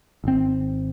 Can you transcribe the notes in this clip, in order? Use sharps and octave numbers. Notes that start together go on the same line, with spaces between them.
G#1 C4